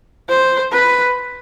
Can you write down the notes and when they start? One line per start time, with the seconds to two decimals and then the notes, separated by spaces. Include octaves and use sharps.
0.29 C5
0.72 B4